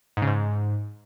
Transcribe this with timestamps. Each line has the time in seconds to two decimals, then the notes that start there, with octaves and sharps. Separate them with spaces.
0.17 G#2
0.22 C#3
0.27 G#2